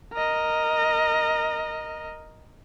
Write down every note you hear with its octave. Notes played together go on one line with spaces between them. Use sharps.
A#4 D#5